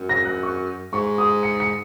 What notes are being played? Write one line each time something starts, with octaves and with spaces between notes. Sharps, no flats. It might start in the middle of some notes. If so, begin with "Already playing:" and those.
Already playing: F#2
A#6
F#6
C#6
G#2 C#6
D#6
C#7
C#7